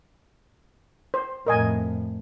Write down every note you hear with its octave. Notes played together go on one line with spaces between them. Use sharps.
C5
F2 A2 A#4 D#5 G#5